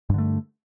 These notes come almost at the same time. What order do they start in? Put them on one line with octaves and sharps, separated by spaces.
G2 D3 A3